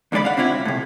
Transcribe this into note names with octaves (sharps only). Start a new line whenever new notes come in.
D#2 D3 G#3 D5 B5
F5 F#5
C4 D4 E4 F4 C#5
C2
A2 C3